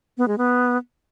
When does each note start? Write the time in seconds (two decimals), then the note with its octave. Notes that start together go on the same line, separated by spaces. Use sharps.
0.18 B3
0.28 G#3
0.38 B3